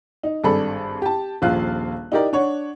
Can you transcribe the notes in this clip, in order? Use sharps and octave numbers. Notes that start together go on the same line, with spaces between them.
D#4
G#1 G2 G#4 A4 D5 B5
G4 A5
D#1 A#1 F4 F5 F#6
D#4 E4 G4 A#4 D5
D4 C#5 F#5